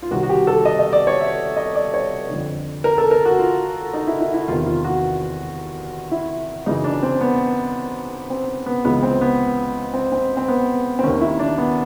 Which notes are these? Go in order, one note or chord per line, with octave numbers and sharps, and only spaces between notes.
F4
C2 C3 D#3 F#4
F#4
G4
A4
D#5
D#5
D5
C#5
E5
D#5
D5
C#5
F2 D3
A#4
A4
A#4
F#4
F4
D#4
E4
E4
E4
E2 C3 D#3 F4
F4
F#4
E4
F#2 C#3 E3 D#4
D4
C4
B3
C4
B3
C#2 C#3 E3 B3
C4
B3
C4
C4
C4
B3
C4
D#2 D#3 C#4
E4
D4
B3